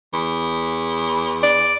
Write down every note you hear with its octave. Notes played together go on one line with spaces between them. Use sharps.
E2
D5